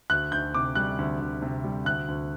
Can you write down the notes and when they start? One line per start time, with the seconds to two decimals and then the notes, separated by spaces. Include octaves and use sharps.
0.10 D2 F#6
0.32 D2 G6
0.54 C3 D6
0.75 G3 F#6
0.98 D2
1.21 D2
1.42 C3
1.64 G3
1.85 D2 F#6
2.08 D2